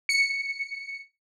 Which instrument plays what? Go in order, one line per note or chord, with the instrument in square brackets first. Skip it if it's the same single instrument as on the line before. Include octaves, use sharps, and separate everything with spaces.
[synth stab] C#7